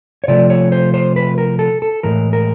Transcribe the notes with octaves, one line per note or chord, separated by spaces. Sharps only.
C#5
C3 F3 A3 D5
C#5
C5
C5
B4
A#4
A4
A4
A2 E3 G#3 A#4
A#4